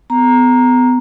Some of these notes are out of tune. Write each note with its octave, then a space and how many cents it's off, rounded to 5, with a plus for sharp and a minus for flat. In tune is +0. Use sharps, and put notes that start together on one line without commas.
B3 +30 A#5 +0